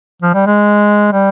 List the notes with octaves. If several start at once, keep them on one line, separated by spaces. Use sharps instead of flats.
F3
G3
G#3
G3